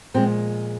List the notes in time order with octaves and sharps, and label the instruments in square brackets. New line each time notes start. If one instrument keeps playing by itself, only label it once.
[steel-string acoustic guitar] A#2 F3 G#3 C4